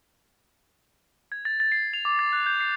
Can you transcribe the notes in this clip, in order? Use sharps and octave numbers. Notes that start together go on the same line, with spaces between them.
G#6
A6
A6
C7
F7
D6
A6
F#6
G6
C7